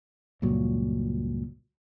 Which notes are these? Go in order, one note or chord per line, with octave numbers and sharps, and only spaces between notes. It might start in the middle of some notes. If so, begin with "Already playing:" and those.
C#2 G2 A#2 F#3